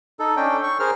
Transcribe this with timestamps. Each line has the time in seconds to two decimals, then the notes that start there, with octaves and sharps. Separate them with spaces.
0.19 D#4 A4
0.36 C#4 D4 G5
0.63 C#6
0.80 G#4 A#4 C5 F6